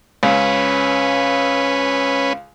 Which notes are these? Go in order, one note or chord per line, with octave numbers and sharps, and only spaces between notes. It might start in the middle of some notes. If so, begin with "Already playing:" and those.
C#2 C#4 B4